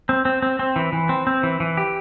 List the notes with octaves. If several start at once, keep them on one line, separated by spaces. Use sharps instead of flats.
C4
C4
C4
C4
E3
E3
C4
C4
E3
E3
G4